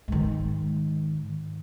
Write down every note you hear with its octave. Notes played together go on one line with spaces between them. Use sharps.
G#2 D#3